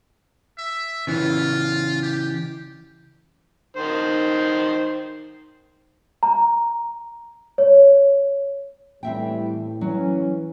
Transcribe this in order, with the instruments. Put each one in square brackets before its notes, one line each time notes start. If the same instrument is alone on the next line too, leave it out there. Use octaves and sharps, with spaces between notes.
[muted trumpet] E5
[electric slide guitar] C#3 E3 [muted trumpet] F4
[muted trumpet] G4
[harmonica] D#3 C5
[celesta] A#5
C#5
[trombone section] A2 [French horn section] E3 G3 [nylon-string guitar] C4 E5 G5
[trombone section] E3 [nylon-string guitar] F#3 [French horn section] C#4